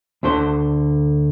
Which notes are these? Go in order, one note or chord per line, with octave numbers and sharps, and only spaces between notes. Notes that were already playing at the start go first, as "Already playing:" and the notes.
D2 D3 C5